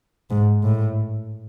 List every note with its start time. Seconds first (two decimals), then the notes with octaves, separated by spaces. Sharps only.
0.30 G#2
0.63 A2